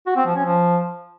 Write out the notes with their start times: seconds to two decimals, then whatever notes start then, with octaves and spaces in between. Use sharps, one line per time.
0.07 F#4
0.16 C4
0.26 F3
0.36 C#4
0.45 F3